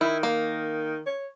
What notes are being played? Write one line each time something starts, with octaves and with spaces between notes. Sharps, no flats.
D#3 E4
A#3
C#5